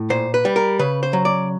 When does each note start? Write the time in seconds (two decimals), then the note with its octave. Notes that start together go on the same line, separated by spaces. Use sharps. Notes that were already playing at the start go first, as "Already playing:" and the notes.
Already playing: A2
0.10 A#2 C5
0.34 B4
0.45 G3
0.56 A#4
0.79 C#3 B4
1.03 C5
1.13 F#3
1.25 D5